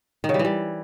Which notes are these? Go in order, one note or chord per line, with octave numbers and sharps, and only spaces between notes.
D#3
C#3
G3
E3
G3